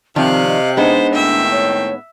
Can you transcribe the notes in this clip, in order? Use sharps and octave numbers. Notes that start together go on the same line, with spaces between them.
C3 D#3 F3 C4 D5 F5 F#6
D#5
G#3 B3 D4 D#4 C5
A2 D#3 C4 E5
C#5